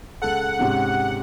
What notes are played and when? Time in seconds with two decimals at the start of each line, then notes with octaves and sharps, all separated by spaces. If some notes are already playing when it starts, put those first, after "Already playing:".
0.22 C#2 A4 F#5
0.59 G#2 C3 C#4